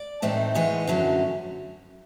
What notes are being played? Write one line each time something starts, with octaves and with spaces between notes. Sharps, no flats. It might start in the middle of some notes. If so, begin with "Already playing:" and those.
Already playing: D5
A2 E3 A3 C4 D#4
G#2 E3 G#3 B3 C#5
F#2 D3 F#3 A3 C#4